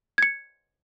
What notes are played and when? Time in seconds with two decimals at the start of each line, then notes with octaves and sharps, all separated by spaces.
0.18 G#6 C#7